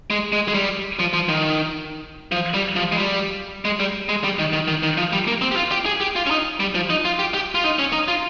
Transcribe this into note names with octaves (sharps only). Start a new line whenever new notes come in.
G#3
G#3
G#3
G3
F3
F3
D#3
F3
G3
F3
G#3
G3
G#3
G3
G#3
G3
D#3
D#3
D#3
D#3
F3
G3
A#3
C4
G4
F4
G4
G#4
G4
F4
C#4
D#4
G3
F3
D#4
F4
G4
G4
F4
D#4
C#4
D#4
F4